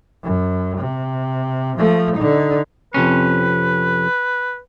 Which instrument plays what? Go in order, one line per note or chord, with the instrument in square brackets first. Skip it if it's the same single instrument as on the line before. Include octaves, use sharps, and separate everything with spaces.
[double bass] F#2
C3
F3 A3
D3 D#4
[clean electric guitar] F2 C3 C#4 [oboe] B4